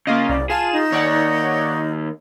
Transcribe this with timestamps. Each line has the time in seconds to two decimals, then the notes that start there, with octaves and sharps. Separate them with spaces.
0.07 C#3 A#3 F4 D#5
0.29 C2 D5
0.50 F4 G#4 A5 E7
0.72 D#4
0.92 D#2 C#5 D5 F#5